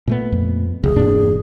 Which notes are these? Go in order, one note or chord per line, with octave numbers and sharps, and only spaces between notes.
A#2 A3 B3
F2
F1 C#2 G#4
E1 G2 B2 A#3 D4